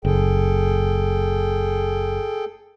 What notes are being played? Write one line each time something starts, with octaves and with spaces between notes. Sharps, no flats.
F#1 G#4 A4 G5